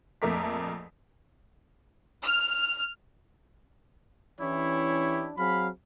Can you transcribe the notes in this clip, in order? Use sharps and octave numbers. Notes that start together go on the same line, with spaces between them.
A#1 F2 A3 A#4 D6 B6
F6
E3 C#4 D4 E4 G4 C#5
F#3 C4 G#4 F5 B5